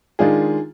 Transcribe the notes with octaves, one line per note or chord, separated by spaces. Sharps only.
D#3 G#3 D4 F4 G#4